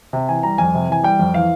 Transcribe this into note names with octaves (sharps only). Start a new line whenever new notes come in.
C3
E3 G#5
G3 A#5
F2 G#5
C3
E3 G#5
G3 G5
F2
E3 F5